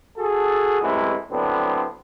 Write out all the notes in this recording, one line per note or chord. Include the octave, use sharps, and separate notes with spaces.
F#4 G#4 A4
F#2 A2 C3 E3 G#3
A2 D3 F#3 B3 C4 D4